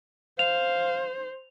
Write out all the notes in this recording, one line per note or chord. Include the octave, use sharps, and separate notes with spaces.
C5 F5 F7